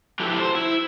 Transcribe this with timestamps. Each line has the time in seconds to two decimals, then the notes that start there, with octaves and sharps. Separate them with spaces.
0.20 F3 F#3 E4 G4 A4 B4
0.38 C5
0.55 E4